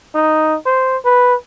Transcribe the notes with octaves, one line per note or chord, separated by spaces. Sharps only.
D#4
C5
B4